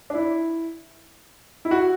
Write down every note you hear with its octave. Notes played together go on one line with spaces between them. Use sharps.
D4
E4
E4
F#4